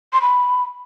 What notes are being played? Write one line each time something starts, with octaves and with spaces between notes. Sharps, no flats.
C6
B5